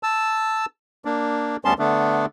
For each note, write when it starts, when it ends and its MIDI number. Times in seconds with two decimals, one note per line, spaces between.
0.03 0.66 81
0.03 0.66 88
1.05 1.57 58
1.05 1.57 62
1.65 1.74 38
1.65 1.74 55
1.65 1.74 59
1.65 1.74 61
1.65 1.74 81
1.65 1.74 84
1.79 2.26 50
1.79 2.26 57
1.79 2.26 59
1.79 2.26 62